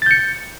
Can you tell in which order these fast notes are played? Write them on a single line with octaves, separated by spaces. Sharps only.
A6 G6 C#7